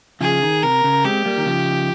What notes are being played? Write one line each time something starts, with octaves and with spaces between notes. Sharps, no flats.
C#3 F3 G#4
D#3
C3 A#4
C#3
G#3 C4 G4
G3 A#3
D#3
C#3 F3